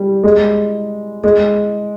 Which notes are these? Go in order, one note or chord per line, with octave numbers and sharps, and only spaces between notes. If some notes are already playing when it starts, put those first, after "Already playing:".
Already playing: G3
G#3
G#3